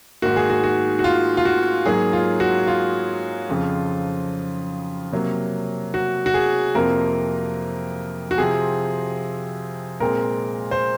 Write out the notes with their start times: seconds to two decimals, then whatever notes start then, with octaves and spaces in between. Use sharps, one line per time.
0.22 G#2 D#3 A#3 F#4
0.36 G#4
0.50 F#4
0.64 F#4
0.99 F#4
1.04 F4
1.37 F4
1.45 F#4
1.86 G#2 F#3 A#3 G#4
2.13 F4
2.40 F#4
2.67 F4
3.49 F2 C#3 F3
5.12 C3 F#3 A#3
5.94 F#4
6.26 F#4
6.34 G#4
6.75 F2 C3 F3 A#3 A#4
8.31 F#4
8.38 C3 F3 C4 G#4
10.00 A#2 G#3 C4 A#4
10.71 C5